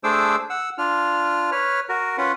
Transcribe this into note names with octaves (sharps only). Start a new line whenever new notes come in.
A3 D4 G#4 C5 D6 E6
F#5 E6
D4 F4 F6
B4 C#5 F6
F#4 A#4
C#4 F4 B4 F#5